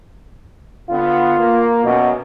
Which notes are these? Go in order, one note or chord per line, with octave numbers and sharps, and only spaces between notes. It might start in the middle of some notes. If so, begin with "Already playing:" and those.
D3 B3 F4
A#3
F#2 B2